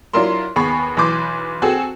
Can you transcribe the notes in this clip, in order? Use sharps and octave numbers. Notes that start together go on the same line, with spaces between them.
F#3 D4 E4 F4 A#4 C6
D#2 B3 G#4 B5 C#6 C7
B1 E3 B4 C6 D6 G6
C4 F#4 G#4 A4